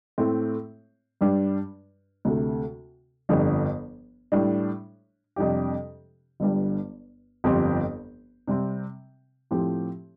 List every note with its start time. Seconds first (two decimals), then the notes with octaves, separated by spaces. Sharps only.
0.18 A2 A3 C4
1.21 G2 G3 D4
2.25 D2 C3 A3
3.29 G1 F2 D3 G3
4.32 A2 G3 D4
5.36 F2 C3 G3 D4 G4
6.40 G1 G2 G3
7.44 G1 F2 F3 C4 G4
8.48 C3 G3 C4
9.51 A2 F3 C4 G4